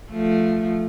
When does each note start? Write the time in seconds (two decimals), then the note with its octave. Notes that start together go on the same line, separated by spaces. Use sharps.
0.11 F3 A3